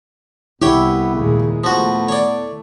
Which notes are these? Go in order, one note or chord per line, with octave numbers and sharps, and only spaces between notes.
C2 B3 E4 G4 C#5 G5
D#2 A#2 C#3 G#3
F3 A3 B3 F#4
C#5 D5